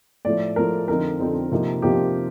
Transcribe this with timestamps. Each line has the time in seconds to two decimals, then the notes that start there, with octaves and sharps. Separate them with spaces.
0.25 A2 F3 A3 D5
0.56 A2 F3 A3 A#4
0.88 F2 D3 F3 C4 D#4 A#4
1.19 F2 D3 F3 C4 D#4
1.52 C3 F3 A#3 D#4
1.82 C3 F3 A#3 D#4 G4